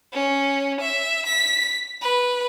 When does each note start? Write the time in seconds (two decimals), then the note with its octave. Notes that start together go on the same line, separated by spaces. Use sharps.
0.13 C#4
0.81 E5
1.26 B6
2.02 B4